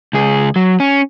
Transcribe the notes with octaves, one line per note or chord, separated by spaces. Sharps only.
C#2 G#4
F#3
C#4